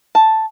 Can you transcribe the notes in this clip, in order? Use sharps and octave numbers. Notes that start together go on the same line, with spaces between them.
A5